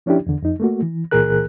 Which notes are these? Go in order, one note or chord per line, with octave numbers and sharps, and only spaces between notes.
F3 C#4 D4 E4 G4
E2 D3
F2 D#4
A3 A#3 F#4
E3
C#2 A#2 E3 G#4 A#4 F#6